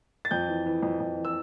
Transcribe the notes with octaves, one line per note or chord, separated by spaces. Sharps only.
A6
F2 G6
E3
E3
F2
F2
E3
E6